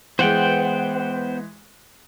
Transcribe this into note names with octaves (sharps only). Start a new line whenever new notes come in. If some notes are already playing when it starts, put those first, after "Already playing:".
E3 G#3 B3 C5 F#5 G5